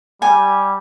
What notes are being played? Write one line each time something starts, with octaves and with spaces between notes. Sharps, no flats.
G3 G#5